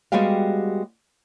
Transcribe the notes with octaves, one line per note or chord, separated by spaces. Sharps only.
G3 G#3 B3 F#4 G4 F5